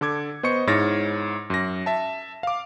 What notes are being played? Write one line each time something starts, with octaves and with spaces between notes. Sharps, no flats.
D3 A4 D6 G#6
B3 C5 D#5 C#6 C#7
G#2 E4 C#5 F6 A6 A#6
F#2 A#6
E5 A5
F5 D6